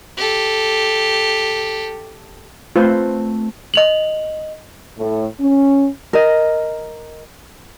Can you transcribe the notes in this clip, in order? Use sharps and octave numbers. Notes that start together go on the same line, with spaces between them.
G4 A4
A3 C4 F4 B4 C5
D#5 F7 F#7
A2
C#4
A#4 D#5